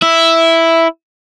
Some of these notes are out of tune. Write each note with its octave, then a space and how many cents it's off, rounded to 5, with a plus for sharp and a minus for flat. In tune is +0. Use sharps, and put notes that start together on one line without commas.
E4 +0 E5 +0